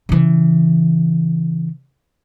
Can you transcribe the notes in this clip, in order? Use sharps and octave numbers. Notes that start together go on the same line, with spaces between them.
C#3 E3